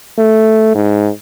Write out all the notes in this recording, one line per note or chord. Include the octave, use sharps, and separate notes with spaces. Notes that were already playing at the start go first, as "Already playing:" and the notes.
A3
G#2